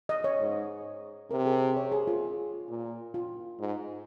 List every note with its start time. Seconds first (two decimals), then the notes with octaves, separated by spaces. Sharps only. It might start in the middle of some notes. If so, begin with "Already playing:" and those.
0.09 D#5
0.24 C#5
0.40 G#2
1.31 C3 A#4
1.46 G#4
1.62 C5
1.77 C#5
1.92 G#4
2.07 F4
2.69 A#2
3.14 F4
3.60 G#2